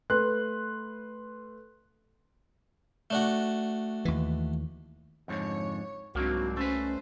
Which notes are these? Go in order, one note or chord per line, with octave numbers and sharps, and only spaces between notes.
A3 B4 C6 F#6
A3 D4 F#4
D#2 E3
F2 G#2 D3 C#5
C2 G#2 F#3 A#3 C4 D4 F#4
A3 C#4 B4 C5